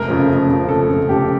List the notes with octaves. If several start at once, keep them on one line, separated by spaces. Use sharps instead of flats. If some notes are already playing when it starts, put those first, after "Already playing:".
Already playing: F1 A#4
F2 C#3 F3
F1
F2 C#3 F3
F1 A4
F2 C#3 F3
F1 G4